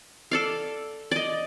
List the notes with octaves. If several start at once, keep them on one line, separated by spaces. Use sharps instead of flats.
A4 D5 F5
D5 D#5